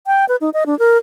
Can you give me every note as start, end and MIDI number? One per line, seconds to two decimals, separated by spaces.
0.07 0.25 79
0.28 0.36 71
0.41 0.50 63
0.54 0.64 75
0.66 0.77 62
0.79 0.97 70